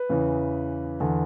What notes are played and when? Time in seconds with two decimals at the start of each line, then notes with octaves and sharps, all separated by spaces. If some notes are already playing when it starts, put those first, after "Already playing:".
Already playing: B4
0.10 E2 C#3 E3
1.00 E2 D3